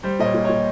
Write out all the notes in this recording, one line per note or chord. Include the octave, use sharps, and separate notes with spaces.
G3 C5
A#2 C#5 D#5
A#2
A#2 C#5